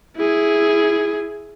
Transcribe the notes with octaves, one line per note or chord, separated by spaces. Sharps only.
E4 G#4